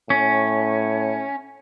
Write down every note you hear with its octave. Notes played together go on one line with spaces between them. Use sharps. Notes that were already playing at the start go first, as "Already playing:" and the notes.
A2 C#4